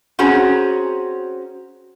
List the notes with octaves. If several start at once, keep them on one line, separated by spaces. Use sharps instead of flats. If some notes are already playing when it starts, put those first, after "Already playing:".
C4 C#4 F#4 G#4 A#5